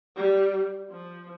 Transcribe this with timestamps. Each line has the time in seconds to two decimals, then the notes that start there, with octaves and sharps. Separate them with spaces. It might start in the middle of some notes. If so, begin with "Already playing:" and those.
0.16 G3
0.91 F3